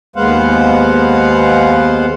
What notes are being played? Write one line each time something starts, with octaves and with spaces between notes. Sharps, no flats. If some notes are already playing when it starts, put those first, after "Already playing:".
D#2 G#3 B3 C5 F5 F#5